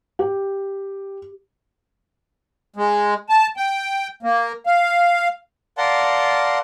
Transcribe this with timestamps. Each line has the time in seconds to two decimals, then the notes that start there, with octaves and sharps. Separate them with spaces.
0.19 G4
2.76 G#3
3.29 A5
3.57 G5
4.23 A#3
4.66 F5
5.78 A#4 D5 F5 F#5 A5 C6